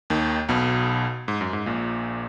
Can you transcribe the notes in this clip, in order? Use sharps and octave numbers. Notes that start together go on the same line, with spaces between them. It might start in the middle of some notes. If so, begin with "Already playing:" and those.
D#2 D#3
B1 B2
G#2
F#2
G#2
A#1 A#2